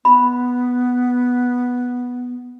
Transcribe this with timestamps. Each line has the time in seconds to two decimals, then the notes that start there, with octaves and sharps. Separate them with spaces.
0.05 B3 B5